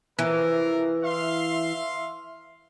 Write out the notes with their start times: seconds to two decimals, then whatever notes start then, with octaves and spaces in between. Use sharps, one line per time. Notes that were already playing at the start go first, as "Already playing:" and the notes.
0.19 C3 E3 F3 A#4
1.04 E5 F5 C6